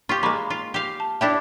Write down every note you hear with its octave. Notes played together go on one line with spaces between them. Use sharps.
F4 G4 C#6
G#3 A#3 B5 C#6 D6
F4
G4 F5
A5
D4 E4 G4 E5 G5